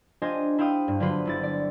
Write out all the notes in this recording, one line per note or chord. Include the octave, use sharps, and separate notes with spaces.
D4 F4 G4 C5 D#5 G#5
E4 C5 F5 G5 D#6
G2
D3 F#3 B3 F4 B4 C5
G1 E4 A6
D5